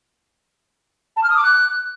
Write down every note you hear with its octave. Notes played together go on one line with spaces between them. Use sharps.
A5
F6
D#6
D6
F#6